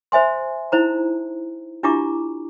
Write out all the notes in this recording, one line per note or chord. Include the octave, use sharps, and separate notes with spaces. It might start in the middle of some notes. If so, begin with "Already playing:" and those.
C5 E5 G#5 C6
D#4 E4 C5 A#5
D4 E4 F4 G4 A#5 D6